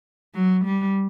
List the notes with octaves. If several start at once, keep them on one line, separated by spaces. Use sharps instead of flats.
F#3
G3